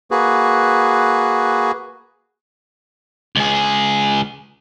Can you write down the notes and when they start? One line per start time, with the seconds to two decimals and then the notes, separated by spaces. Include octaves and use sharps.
0.11 A#3 F#4 G#4 B4
3.35 C#2 G#4